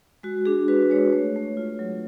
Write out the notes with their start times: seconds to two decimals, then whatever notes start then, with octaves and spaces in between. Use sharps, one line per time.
0.23 G#3 F#4
0.45 D4 G#4
0.68 F#4 B4
0.90 G#3 C#5
1.12 A3
1.36 A3
1.57 F4
1.79 F#3